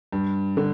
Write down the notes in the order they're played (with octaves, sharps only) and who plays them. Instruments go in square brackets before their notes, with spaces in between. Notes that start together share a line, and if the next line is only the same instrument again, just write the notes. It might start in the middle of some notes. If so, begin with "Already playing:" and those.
[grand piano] G2
D3